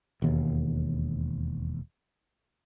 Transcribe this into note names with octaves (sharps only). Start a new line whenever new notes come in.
E1 D#2